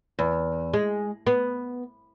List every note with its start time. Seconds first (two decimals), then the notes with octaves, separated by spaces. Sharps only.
0.19 E2
0.73 G#3
1.27 B3